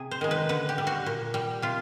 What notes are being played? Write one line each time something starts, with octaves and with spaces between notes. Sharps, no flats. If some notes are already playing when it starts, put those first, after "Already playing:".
Already playing: C3 G#4
C5
D#3 G#3
B4
D3 B4
G4
G3
F#4
A#2
G3
C3 F4